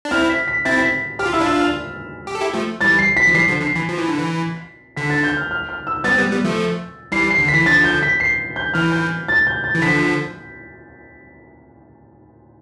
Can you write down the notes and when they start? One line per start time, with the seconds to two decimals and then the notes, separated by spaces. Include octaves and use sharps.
0.05 D4
0.11 C4 E4 F6
0.29 B6
0.48 B6
0.65 C4 E4 A6
0.79 B6
1.19 G4 F6
1.26 F4
1.33 E4 E6
1.40 D4 F4
1.46 E6
1.59 F6
2.27 G4
2.35 A4
2.41 E4 G4
2.53 F3 A3
2.81 E3 G3 A6
2.99 C7
3.17 B6
3.27 F3
3.35 E3 G3 C7
3.48 D3 F3
3.61 D3 C7
3.76 E3
3.89 F3
3.99 E3
4.08 D3
4.18 E3
4.97 D3 B6
5.10 A6
5.23 G6
5.37 F6
5.51 F6
5.69 F6
5.87 E6
6.04 G3 B3 A6
6.11 C4
6.18 G3 B3
6.32 G3 B3
6.44 F3 A3
7.12 E3 G3 C7
7.31 C7
7.38 D3
7.48 B6
7.53 E3
7.66 D3 F3 A6
7.84 G6
8.03 B6
8.20 C7
8.56 G6
8.74 E3 F6
8.92 G6
9.28 A6
9.47 G6
9.64 A6
9.75 E3
9.82 D3 F3 B6
10.00 B6